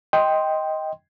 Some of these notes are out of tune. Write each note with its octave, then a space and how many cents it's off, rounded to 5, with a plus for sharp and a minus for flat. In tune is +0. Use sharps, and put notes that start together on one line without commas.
D#5 +10 G5 +0 C6 +0